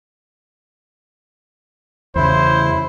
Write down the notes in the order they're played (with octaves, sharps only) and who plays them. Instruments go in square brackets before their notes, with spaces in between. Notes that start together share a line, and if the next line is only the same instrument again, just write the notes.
[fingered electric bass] E2 C#3 [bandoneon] E4 [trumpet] C5